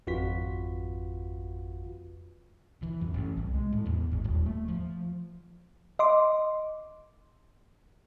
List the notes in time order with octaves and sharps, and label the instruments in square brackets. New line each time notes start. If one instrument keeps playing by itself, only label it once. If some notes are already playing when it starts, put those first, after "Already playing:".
[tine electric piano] G#1 F2 F4 F#4 B4 B6
[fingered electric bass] E3
F#2
A1
C2
G#3
A2
E2
G#1
D#1
A3
F3
[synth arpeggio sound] D#5 C6 D6